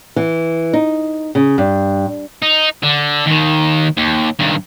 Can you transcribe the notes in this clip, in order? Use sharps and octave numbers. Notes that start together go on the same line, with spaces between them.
E3
D#4
C#3
G2
D#4
D3
D#2 D#3
D#2
G2 D#3